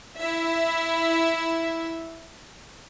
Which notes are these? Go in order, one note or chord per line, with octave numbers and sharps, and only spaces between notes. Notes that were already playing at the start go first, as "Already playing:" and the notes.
E4 E5